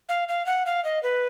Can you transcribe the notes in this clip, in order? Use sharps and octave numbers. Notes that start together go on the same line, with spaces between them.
F5
F5
F#5
F5
D#5
B4